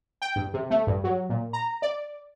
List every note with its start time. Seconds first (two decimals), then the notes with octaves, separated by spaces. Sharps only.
0.22 G5
0.36 G2
0.53 C3
0.70 A3
0.87 G2
1.04 F#3
1.29 A#2
1.53 A#5
1.82 D5